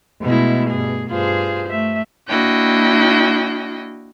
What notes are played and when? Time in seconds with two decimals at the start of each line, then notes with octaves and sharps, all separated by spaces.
0.23 B2 G#3 A3 E4
0.70 G2 G#4
1.09 G2 F4 G#4 C5
1.69 A3 E5
2.27 A#3 D4 E4 F#4 D#5 G5